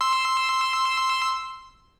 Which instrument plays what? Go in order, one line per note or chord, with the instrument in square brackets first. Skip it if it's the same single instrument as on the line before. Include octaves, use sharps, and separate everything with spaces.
[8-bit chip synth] C6 E6